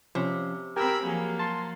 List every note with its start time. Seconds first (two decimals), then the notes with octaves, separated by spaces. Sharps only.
0.15 C3 F3 C#4
0.76 C4 G4 A#4 G#5 B5 E6
1.05 F3 F#3 A#3 G#4
1.39 A5 C6